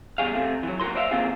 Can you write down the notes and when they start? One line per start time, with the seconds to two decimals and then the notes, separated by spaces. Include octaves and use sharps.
0.18 E2 G3 G#4 F5
0.32 C3 A3
0.63 E3 F#3
0.80 D#2 F#4 A#4 C6
0.95 C5 D5 E5 F5
1.11 D#3 A#3 C4 F4 G#4